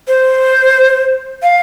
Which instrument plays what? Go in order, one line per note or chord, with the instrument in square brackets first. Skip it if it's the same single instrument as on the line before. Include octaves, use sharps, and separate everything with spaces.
[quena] C5
F5